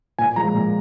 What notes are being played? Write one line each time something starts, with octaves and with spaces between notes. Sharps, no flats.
A#2 G#5
F3 G#3 A#5
A#2